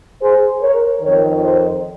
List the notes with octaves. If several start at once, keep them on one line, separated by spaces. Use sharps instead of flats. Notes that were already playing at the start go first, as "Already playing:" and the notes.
G#4 C5
A#4 C#5
F2 D#3 A#4 C#5
C5 D#5